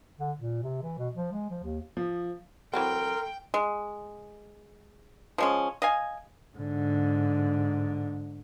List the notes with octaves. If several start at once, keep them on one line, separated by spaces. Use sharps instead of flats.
D3
A#2
C3
E3
B2
F3
G#3
F3
D#2
F3
E3 F#3 C4 A4 A#4 G5 C6
G#3
F3 G#3 C#4
D#5 F5 G#5
G#2 D3